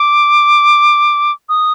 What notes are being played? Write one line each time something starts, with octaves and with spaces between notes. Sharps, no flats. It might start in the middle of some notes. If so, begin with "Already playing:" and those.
Already playing: D6
D#6